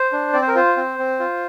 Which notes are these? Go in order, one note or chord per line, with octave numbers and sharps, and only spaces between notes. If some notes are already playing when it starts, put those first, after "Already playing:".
Already playing: C5
D4
C4 D5
C5
A#4
F4 C5
C4
C4
F4